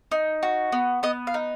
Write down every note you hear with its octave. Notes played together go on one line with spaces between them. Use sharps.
D#4
F#4
B3
B3 D#5
F5
D#4